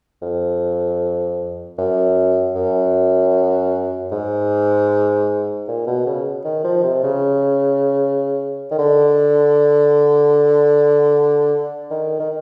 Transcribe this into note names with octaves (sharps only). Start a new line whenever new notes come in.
F2
F#2
F#2
G#2
A#2
B2
C#3
D#3
F3
C3
C#3
D#3
D3
D#3
D#3